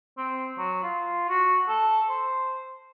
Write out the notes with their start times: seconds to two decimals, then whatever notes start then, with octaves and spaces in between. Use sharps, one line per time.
0.18 C4
0.58 F#3
0.83 F4
1.29 F#4
1.68 A4
2.10 C5